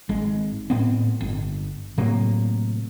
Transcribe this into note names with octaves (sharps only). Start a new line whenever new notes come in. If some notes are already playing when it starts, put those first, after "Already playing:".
G#1 G#3
A2 B3 C4
G1
A2 C3 F#3 A#3